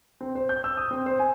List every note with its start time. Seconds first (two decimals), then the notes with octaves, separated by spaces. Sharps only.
0.21 C4
0.35 C5
0.49 G6
0.64 E6
0.77 D#6
0.91 C4
1.06 C5
1.19 G#5